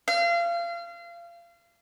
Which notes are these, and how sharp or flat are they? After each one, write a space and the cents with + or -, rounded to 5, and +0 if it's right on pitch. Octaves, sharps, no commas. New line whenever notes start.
F5 -30